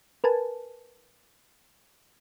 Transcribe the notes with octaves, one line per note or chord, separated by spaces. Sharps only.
A#4 B4 G#5 A5